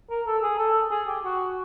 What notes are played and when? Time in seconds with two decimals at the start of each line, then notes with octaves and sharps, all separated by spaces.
0.10 A#4
0.26 A4
0.43 G#4
0.59 A4
0.91 G#4
1.08 G4
1.24 F#4